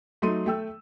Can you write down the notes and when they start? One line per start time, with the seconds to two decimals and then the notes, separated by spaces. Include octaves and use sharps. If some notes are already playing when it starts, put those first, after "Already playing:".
0.22 F#3 A3 D#4 C6 D#7
0.46 A3 G5 E6